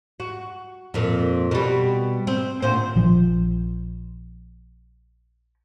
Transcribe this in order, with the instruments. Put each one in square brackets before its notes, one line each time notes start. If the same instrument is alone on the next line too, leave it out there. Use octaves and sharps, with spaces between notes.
[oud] F#4
F2 A#2
B2 G3
C4
D2 A#2 C5
[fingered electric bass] A#1 F3